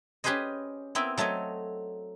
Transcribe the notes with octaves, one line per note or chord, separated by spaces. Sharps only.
C#4 G4 G#4 B4 C5 D#5
B3 C4 E4 A#4
F#3 A3 C4 C#5 D#5